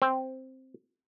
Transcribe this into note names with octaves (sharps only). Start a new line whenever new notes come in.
C4